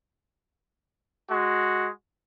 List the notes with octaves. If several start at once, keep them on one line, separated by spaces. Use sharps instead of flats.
G#3 F#4